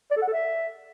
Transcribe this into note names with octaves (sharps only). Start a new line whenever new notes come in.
D5
A4
F#5
A4
E5